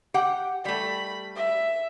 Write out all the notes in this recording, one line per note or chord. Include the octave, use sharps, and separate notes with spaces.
G4 F#5 G5
G3 A3 B5
E5